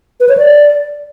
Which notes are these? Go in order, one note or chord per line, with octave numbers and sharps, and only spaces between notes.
B4
C#5
D5